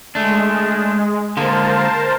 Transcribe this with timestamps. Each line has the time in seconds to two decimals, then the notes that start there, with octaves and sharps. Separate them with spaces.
0.15 G#3 A3 D4
1.37 D3 G#3 A#3 A#4 C5 A5